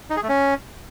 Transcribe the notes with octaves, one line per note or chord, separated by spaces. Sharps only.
D#4
G#4
A3
C#4